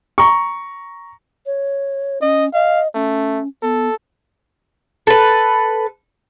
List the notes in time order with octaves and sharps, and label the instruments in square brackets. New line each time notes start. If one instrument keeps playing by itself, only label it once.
[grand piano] A#5 C#6
[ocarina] C#5
[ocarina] C#4 [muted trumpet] D#5
[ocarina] D#5 [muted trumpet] F5
[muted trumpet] A3 [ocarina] C#4
[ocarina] B3 [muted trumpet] A4
[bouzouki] A4 B4